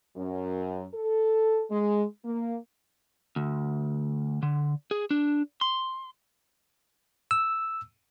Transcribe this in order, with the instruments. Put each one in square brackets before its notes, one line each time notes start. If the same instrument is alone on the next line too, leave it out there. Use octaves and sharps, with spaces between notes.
[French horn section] F#2
A4
G#3
A#3
[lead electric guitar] D2
D3
G#4
D4
C6
[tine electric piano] E6